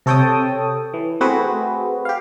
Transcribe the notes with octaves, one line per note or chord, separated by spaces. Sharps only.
C3 A4 C#5 G5 A5 D#6
E3
A3 C4 F#4 G#4 B4
G4 F5